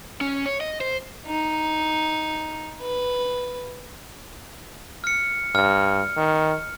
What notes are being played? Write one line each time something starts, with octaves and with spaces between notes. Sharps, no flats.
C#4
C#5
D#5
C5
D#4
B4
F6 C#7
G2 F6
D#3